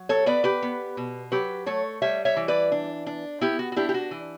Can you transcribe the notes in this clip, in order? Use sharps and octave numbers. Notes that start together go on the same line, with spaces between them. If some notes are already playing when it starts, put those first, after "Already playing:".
Already playing: F#3
A4 C#5
B3 B4 D5
G4 B4
B3
B2
F#3 G4 B4
A3 A4 C#5
G3 C#5 E5
C#5 E5
E3
B4 D5
D4
D4
B3 E4 G4
F#4
F#4
D4 E4 G4
G4
F#4
E3